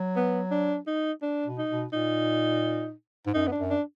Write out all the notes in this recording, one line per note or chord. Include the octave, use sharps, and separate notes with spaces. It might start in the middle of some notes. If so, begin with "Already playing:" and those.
Already playing: F#3
B3
D4
D#4
D4
B2
D#4
B2
A#2 D#4
G#2
F#2 D#4
B3
D4
F#2
D4